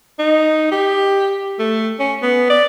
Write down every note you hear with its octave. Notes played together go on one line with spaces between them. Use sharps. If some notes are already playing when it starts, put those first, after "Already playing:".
D#4
G4
A3
C#4
B3
D5